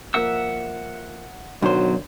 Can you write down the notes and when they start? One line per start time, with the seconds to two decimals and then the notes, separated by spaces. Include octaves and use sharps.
0.14 F3 A#3 A#4 E5 F#5 E6
1.62 B1 D3 D#3 F#3 D4 C5